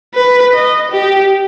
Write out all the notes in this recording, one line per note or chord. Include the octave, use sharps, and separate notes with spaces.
B4
D#5
G4